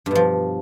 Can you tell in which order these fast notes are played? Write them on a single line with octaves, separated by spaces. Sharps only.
G2 B2 F3